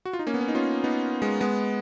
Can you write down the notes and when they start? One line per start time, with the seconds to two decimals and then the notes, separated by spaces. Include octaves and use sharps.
0.05 F#4
0.13 F4
0.19 D#4
0.27 A#3 C#4
0.34 B3
0.41 C#4
0.48 D#4
0.55 C#4 F4
0.84 B3 D#4
1.22 G#3 B3
1.40 G#3 B3